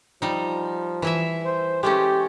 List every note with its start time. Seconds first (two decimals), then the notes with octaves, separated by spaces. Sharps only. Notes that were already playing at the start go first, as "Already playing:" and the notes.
0.22 F3 G3 D#4
1.02 E3 E4 E5
1.45 C5
1.83 G#3 A3 C#4 G4